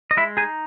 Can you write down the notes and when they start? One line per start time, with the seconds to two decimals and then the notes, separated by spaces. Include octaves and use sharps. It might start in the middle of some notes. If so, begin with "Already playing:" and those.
0.11 D#5
0.17 G#3 E4 E5
0.37 D#4 G#4 G#5